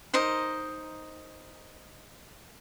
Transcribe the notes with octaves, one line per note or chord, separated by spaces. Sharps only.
D#4 A#4 C5 D#5